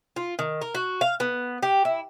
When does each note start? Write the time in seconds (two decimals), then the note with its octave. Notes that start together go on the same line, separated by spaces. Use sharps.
0.16 F4
0.39 D#3
0.61 A#4
0.75 F#4
1.01 F5
1.20 B3
1.62 G4
1.85 E4